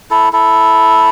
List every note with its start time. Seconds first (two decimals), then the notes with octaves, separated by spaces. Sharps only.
0.11 E4 A4
0.33 E4 A4